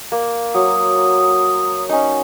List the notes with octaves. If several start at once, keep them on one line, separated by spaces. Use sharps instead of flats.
A#3
F#3 D#6
C#4 D#4